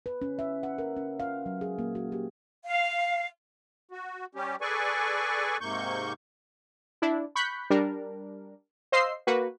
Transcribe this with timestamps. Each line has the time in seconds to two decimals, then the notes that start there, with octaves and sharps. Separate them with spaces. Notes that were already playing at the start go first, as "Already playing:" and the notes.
0.06 B4
0.22 C#4
0.39 E5
0.63 F#5
0.78 A#4
0.96 C#4
1.20 F5
1.46 F#3
1.61 G#4
1.79 A#3
1.95 F#4
2.12 G4
2.64 F5
3.91 F#4
4.35 G3 C#4 G4
4.61 G#4 A4 B4 D5 G#5 C#6
5.61 G#2 C3 A#3 C#6 G6
7.02 D4 E4
7.35 B5 C#6 F#6 G6 B6
7.70 G3 D4 A#4
8.92 C5 D#5 F5 C6 E6 C7
9.27 A#3 F#4 B4